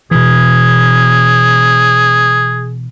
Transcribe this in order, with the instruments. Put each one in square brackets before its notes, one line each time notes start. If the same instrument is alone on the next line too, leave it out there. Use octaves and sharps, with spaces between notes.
[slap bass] B2 E3 [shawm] G#4